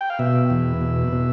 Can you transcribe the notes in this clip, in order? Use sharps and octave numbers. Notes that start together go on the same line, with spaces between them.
G5
F5
B2 E5
E2
B2
B2